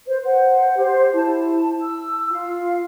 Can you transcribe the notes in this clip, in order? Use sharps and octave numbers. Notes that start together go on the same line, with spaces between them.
B4 C5
C5 F#5
G4 C5
E4 A5
E6
F4 F5